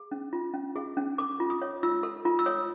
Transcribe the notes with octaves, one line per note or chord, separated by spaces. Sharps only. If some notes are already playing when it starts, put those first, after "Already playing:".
Already playing: G#4
C#4
F4
C#4
G#4
C#4
A4 D6
F4
D#6
C#5
F4 E6
A4
F4
E6
C#5 D#6